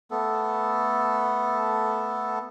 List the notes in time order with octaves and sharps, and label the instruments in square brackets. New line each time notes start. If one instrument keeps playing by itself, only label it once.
[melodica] A3 B3 A4